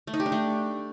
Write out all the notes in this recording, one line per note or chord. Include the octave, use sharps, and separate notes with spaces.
A3
D#4
G4
D4
A3